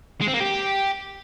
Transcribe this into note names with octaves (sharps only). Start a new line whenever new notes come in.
G#3
C4
A#3
G4